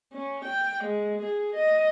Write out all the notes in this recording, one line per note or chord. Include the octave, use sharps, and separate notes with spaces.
C#4
G5
G#3
G#4
D#5